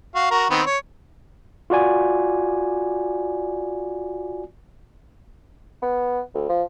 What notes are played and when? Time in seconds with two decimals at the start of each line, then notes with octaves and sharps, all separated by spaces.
0.15 F#4 F5
0.31 F#4 A#4
0.50 D#3 B3 C4
0.66 C#5
1.70 F4 F#4 D5 G#5
5.82 B3
6.34 D2
6.49 F3